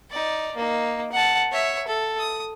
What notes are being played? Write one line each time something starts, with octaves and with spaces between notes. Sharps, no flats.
D#4 D5
A#3 D#4
F#5 A5
C#5 E5
A4
D#6